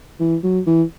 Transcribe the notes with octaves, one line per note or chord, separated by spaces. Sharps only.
E3
F#3
E3